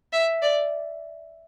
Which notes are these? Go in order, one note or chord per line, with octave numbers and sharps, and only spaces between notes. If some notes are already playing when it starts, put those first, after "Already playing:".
E5
D5